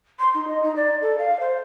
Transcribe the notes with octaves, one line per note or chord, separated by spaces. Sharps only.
C6
D#4
D#5
D#4
D5
A4
F5
C5